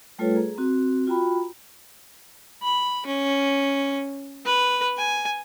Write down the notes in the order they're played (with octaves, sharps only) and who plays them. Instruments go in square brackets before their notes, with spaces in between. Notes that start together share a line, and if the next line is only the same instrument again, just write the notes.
[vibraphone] G3 A3 F4 A4 B4 C#5
G#4 A#5
C4 F#4
F4 F#4 G5 A#5 B5
[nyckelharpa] B5
C#4
B4
G#5